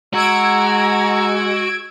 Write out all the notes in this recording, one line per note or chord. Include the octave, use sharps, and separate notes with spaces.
G#3 F#4 A#5 E6 G#6 D7